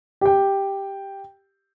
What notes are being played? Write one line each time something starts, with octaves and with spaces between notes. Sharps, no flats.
G4 G5